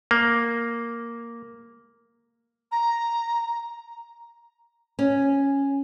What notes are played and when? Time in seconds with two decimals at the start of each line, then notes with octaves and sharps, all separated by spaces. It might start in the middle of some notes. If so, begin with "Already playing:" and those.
0.11 A#3
2.71 A#5
4.99 C#4